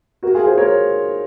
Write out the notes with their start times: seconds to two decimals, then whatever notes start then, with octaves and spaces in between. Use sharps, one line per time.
0.23 F#4 A#4
0.34 F4 G#4
0.46 G#4 C5
0.58 A#4 C#5